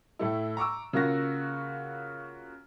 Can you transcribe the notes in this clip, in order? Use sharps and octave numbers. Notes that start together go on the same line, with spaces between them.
A2 A3 E4
A#5 C#6 D6 E6
C#3 A#3 F4 F#4 A#6